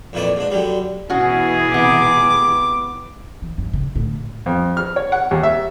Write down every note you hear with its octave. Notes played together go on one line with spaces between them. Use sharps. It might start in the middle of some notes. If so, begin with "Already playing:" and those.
F2 A#2 E3 A3 D5
G#2 D4
D3 F#3 G3
B2 E3 C#4 F#4 G#4
C3 B3 D6
E3
G2
C#3
A2 D3
F2
F6
C#5
F#5
D#2
E5